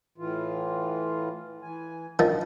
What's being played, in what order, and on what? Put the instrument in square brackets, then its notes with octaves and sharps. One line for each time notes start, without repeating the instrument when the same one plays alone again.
[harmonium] A2 E3 F4
E3 G#5
[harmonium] B2 D4 [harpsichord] D#3 F3